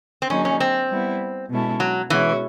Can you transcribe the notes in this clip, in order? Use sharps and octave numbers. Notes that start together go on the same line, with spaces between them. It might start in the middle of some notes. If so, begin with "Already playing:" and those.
C4
D3 F#3 A#3 C#4 D#4 G#4
C#4
C4
G3 B3 E4
B2 G#3 C#4 E4 A4
F#3
B2 E3 G#3 C#4 F#4